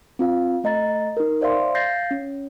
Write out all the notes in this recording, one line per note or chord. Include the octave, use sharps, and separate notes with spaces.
C4 F4 F5
A3 D#5 A#5 A6
D#4 A#4
C5 D5 E5 F5 C6
F5 G6 A6 A#6 C7
C#4